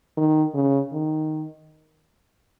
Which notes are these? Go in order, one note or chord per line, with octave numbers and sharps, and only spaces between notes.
D#3
C#3
D#3